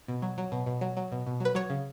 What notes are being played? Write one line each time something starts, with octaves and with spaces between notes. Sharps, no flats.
B2
F#3
F#3
B2
B2
F#3
F#3
B2
B2
F#3 B4
F#3 C#5
C#3